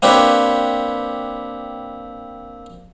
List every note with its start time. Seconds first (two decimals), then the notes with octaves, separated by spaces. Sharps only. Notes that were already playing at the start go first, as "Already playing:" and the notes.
0.02 A#3 C4 D4 G4 B4 C#5